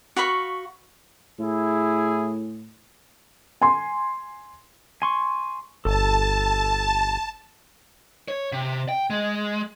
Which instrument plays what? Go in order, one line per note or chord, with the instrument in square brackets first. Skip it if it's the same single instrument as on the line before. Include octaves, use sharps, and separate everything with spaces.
[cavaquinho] F#4 F5 B5 C#6
[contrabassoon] A2 [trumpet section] E4 G#4
[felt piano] G#5 C6
[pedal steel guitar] G#5 C6 C#6
[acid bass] G1 [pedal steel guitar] A4 [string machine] A5
[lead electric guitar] C#5
C3
G5
G#3